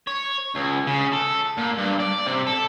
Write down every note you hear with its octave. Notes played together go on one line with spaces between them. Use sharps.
C#5
C#2
C#3
A4
A#2
G2
D5
C3
A4